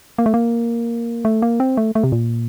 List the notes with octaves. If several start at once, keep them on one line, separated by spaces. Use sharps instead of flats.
A#3
A3
A#3
A3
A#3
C4
A3
A3
C3
A#2